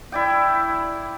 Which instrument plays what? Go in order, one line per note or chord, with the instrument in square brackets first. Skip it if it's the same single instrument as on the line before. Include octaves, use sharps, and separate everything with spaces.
[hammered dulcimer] E4 D5 G5